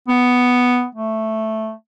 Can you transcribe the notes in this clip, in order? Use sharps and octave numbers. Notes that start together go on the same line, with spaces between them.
B3
A3